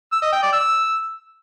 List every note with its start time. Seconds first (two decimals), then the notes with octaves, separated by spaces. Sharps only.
0.12 E6
0.22 D#5
0.32 G5
0.42 D5
0.53 E6